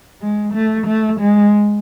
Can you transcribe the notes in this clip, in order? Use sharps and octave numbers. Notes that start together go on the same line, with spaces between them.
G#3
A3
A3
G#3